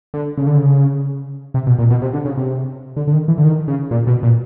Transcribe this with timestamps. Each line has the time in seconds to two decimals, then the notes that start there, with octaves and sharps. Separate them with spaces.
0.14 D3
0.37 C#3
0.47 D3
0.57 C#3
1.54 C3
1.67 B2
1.79 A#2
1.90 B2
2.02 C3
2.13 D3
2.25 C#3
2.37 C3
2.97 D3
3.07 D3
3.13 D#3
3.28 E3
3.38 D3
3.44 D#3
3.68 C#3
3.91 A#2
4.07 B2
4.23 A#2